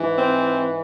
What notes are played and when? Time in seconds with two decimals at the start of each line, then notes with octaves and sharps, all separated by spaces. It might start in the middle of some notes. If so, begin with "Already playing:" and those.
Already playing: G#2 E3
0.17 C4